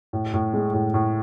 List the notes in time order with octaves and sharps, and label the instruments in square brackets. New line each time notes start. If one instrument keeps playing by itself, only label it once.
[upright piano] A2
A2
G#3
A2
A2